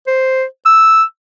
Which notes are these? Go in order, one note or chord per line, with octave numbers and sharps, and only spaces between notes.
C5
E6